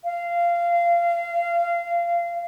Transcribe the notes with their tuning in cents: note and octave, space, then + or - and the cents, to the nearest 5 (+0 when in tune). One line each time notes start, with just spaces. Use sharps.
F5 -20